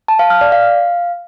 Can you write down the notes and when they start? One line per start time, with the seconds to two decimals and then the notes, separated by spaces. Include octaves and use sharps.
0.08 A5
0.19 F5
0.30 F6
0.41 D5
0.52 F5